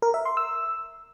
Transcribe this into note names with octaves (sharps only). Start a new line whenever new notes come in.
A#4
E5
C6
E6